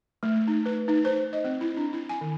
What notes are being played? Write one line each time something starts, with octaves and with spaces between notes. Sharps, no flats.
A3
D#4
B4
D#4
C5
D#5
C4
E4
D4
E4
G#5
D#3